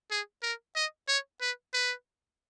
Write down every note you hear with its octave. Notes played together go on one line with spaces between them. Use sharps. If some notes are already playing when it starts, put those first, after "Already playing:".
G#4
A#4
D#5
C#5
B4
B4